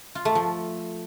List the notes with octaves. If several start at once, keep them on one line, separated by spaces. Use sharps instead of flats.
F4
A3
F3